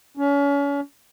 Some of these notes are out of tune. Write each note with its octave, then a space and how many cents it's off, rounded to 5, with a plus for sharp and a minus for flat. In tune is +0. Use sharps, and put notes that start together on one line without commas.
C#4 +35